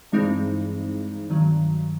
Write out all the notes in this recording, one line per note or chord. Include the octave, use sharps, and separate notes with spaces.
G2 E3 G#3 C4 D#4
G2 D#3 F#3